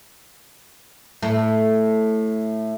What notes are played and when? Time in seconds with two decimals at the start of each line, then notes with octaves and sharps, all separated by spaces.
1.22 A2 A3